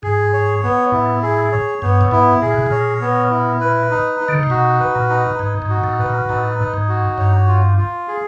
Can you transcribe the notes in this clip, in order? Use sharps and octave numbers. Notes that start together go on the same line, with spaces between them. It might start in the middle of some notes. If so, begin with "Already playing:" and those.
G#2 G#4
C#5
B3
A2 E4
G#4
C#5
G2 B3
A2
G#2 E4
A#2 G#4
B2
A#2 C#5
B3
E4
B4
D#4
D#4
D3
C#3
C3
B2 F#4
B4
A#2
D#4
G#2 D#4
G#2
F#4
A2
B4
A#2
A2 D#4
D#4
G#2
F#4
G2 C#5
F4
F4
G#4